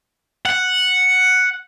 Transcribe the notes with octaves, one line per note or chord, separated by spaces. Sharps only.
F#5